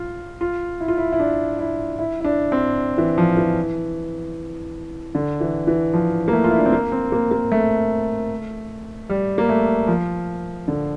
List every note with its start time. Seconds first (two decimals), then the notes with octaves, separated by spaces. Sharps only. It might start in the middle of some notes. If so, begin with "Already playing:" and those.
Already playing: F4
0.41 F4
0.81 E4
0.88 F4
0.97 E4
1.12 E4
1.19 D4
1.59 E4
1.99 E4
2.21 E4
2.25 D4
2.52 C4
2.98 E3
3.18 F3
3.37 E3
5.15 D3
5.40 E3
5.67 E3
5.94 F3
6.28 A#3
6.33 A3
6.44 F4
6.51 E4
6.58 D4
6.66 C4
6.72 A#3
6.92 C4
7.12 A#3
7.31 A#3
7.52 A3
9.09 G3
9.38 A#3
9.49 A3
9.88 F3
10.68 D3